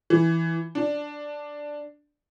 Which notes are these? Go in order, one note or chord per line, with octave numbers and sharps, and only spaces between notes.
E3
D4